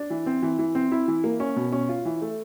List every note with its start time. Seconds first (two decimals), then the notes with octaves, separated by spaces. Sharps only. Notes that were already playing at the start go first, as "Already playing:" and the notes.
Already playing: D4
0.10 E3
0.26 C4
0.42 E3
0.59 E3
0.75 C4
0.92 E4
1.08 E3
1.24 A#3
1.40 C#4
1.56 B2
1.72 C#4
1.89 F4
2.05 E3
2.22 A3